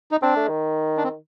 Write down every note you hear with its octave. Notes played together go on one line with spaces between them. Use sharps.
D#4
C4 D4
A3
D#3
D4
C4